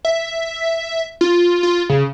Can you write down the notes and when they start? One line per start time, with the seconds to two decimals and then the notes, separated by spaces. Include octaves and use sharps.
0.05 E5
1.21 F4
1.63 F4
1.89 C#3